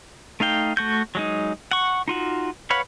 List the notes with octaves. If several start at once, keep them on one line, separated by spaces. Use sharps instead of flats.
A3 D#4 F5 G5
A3 F#4 G6
F#3 G#3 D#4
F#5 C#6
D#4 F4 F#4
B4 C#5 F5 F#5 B5